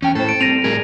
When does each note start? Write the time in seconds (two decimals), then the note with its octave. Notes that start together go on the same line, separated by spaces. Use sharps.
0.02 E2 C#4 G5
0.15 A2 A4 C5
0.29 D7
0.41 G3 C4 A#6 D#7 F7
0.64 A2 G3 G#4 A#4